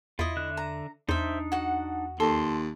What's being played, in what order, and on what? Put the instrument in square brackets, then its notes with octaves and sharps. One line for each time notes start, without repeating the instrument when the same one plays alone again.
[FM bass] E2 [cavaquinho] E4 D#5 [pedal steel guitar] F4
[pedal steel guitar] D3 E5 F#6
[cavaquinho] A#5
[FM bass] E2 [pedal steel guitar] D4 D#4 [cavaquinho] C5 E5
[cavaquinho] F#4 F#5
[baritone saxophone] D#2 [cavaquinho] A4 [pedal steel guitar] C6